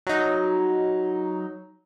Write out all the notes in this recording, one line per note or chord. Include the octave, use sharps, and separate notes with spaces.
F#3 D#4